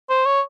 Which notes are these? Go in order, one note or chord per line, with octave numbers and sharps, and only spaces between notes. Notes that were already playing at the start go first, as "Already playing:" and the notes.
C5
C#5